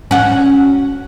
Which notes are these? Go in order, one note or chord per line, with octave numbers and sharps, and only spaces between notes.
C#4 F#4